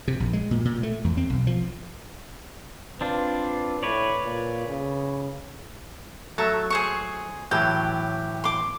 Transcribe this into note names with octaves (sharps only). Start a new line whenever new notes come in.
C3
A#1
G#3
A#2
A#2
A3
E2
C4
B1
F3
C4 D4 F4 B4
A2 B4 C#5 D5
A#2
C#3
F#3 A3 A4 E5 A#5
G#4 C5 C#6
A2 E3 F#3 G4 G5
C6 D6